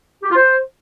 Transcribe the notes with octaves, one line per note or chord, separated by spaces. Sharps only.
G4
F4
C5